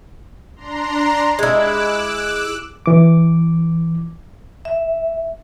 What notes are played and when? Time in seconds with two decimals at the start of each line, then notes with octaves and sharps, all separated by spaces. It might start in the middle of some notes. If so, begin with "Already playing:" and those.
0.56 D4 A#5 C6
1.39 G#3 E4 D6 E6 F#6
2.86 E3 D6
4.65 E5